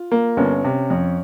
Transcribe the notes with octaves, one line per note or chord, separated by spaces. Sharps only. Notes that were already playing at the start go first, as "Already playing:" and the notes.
Already playing: F4
A#3
G1 C#4
C3
F2